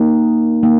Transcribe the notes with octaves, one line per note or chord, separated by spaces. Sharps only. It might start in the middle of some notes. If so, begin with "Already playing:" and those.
Already playing: A#3 D#4
A#3 D#4